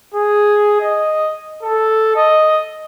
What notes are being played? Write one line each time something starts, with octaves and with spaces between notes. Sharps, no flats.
G#4
D#5
A4
D#5